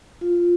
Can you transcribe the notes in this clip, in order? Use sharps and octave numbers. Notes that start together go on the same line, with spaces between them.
F4